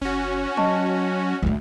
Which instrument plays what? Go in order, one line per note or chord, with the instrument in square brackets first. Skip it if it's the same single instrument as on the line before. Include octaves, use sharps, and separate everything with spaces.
[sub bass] F#1 [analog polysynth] C#4 F#4
[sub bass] F#3 [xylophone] D#5 A5 C#6
[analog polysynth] D2 [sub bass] G#2 [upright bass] G#3 A3